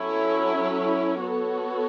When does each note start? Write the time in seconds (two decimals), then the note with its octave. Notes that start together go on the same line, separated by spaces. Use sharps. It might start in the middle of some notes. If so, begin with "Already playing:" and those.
Already playing: F#3 C#4 E4 A4 C#5
1.22 B3 F#4 A4 C#5